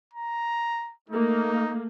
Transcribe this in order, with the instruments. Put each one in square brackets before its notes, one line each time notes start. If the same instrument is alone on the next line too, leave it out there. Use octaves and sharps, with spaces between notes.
[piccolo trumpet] A#5
[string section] A3 A#3 [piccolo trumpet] D#4